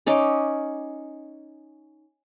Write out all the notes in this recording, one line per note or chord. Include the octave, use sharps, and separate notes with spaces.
C#4 D#4 D6